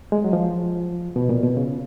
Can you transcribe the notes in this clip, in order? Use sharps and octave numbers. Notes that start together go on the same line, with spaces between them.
G#3
F#3
F3
B2
A#2
B2
C#3